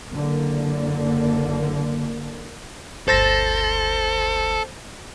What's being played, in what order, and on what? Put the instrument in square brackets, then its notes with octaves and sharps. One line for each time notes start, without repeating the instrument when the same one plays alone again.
[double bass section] F#1 D3 A#3
[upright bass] G1 D2 [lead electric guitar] A4 [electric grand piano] C5 A6 A#6